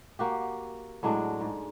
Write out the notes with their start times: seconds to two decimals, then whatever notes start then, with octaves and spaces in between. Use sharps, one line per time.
0.19 A#3 F#4 G4
1.03 A2 F#3 G#3 D4
1.41 G#2